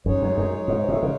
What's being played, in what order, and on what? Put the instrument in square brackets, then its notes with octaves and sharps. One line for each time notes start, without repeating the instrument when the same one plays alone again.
[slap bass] F#2 [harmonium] G#3 D#4 G#4 C#5
[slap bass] F#2
F#2
G#2
A2
C#3